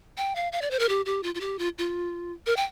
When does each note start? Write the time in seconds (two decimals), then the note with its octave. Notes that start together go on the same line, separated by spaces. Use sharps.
0.17 G5
0.35 F5
0.52 F5
0.62 D5
0.71 C5
0.79 A#4
0.89 G4
1.06 G4
1.23 F4
1.35 F4
1.41 G4
1.59 F4
1.78 F4
2.46 A#4
2.57 G5